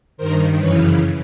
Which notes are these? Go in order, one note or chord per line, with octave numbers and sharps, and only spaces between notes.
G2 D#3 A#4 C5
F#2 C#3 E3 B4 C#5